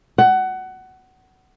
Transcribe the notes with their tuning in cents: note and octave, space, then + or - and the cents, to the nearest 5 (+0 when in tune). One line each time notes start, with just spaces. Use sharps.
F#5 +20